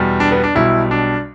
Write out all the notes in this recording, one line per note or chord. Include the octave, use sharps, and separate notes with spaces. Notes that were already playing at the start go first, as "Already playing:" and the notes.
Already playing: E2 B2 G3
D4
B3
D4
B1 B2 G3 E4
D4